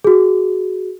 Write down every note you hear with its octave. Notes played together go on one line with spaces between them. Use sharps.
F#4 G#4